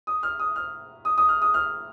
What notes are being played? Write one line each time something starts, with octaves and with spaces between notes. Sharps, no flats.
D#6
F6
D#6
F6
D#6
D#6
F6
D#6
F6